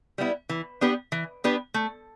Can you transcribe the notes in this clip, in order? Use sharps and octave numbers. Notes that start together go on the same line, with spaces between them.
G3 B3 E4
E3
B3 D4 G4 B4
E3
B3 D4 G4 B4
A3